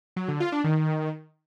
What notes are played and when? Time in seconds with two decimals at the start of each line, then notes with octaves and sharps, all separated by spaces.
0.16 F#3
0.28 D3
0.40 F4
0.52 D4
0.64 D#3